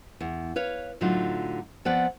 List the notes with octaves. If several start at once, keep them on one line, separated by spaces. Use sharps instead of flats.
E2
B4 C#5 F5
A2 D3 F#3 D4 D#4 F4
F3 B3 C4 D5 F#5